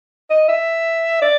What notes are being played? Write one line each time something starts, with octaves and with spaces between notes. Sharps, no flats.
D#5
E5
D5